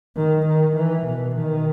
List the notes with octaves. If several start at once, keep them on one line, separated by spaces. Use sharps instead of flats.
D#3
D#3
E3
B2
D#3